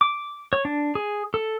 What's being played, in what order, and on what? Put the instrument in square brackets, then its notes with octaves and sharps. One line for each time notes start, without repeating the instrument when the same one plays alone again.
[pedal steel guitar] D6
C#5
D4
G#4
A4